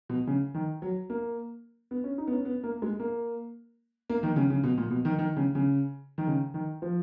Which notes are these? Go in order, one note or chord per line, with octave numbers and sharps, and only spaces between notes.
B2
C#3
D#3
F#3
A#3
B3
C#4
D#4
B3
C#4
B3
A#3
G#3
A#3
A#3
D#3
C#3
C#3
B2
A#2
B2
D#3
D#3
C#3
C#3
D#3
C#3
D#3
F3